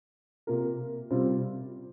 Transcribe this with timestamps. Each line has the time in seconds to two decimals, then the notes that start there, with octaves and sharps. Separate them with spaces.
0.47 C3 A#3 F4 A#4
1.10 C3 G3 C4 F4